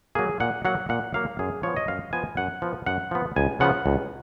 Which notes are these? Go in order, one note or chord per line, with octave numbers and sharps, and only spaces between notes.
F#3 A#3 G#4
A#2 F#5
F#3 A#3 F#5
A#2 F#5
F#3 A#3 F5
F#2 G#4
F3 B3 C#5
D#5
F#2 F5
F3 B3 G#5
F#2 F#5
F3 B3
F#2 F#5
F3 B3
C#2 G#5
C#3 F3 B3 F#5
C#2